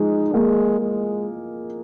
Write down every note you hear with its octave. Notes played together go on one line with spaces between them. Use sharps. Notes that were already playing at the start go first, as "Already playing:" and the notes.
Already playing: F3 G#3 D#4
G#3 A#3
G#3